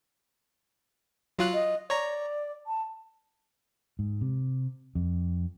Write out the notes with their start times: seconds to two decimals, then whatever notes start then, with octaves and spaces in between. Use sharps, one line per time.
1.39 F#3 F4 F#6
1.54 D#5
1.90 C#5 D5 A#5
2.67 A5
3.99 G#2
4.21 C3
4.95 F2